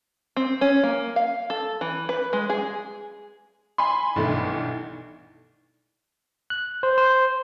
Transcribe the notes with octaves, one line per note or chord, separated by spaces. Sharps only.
C4
C#4
A#3
F5
A4
E3
B4
G#3
G#4
G#5 B5 C6
B1 G2 D#3 E3 A3
F#6
C5
C5